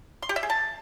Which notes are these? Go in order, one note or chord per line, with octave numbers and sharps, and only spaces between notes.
C6
G4
E5
G#4
A5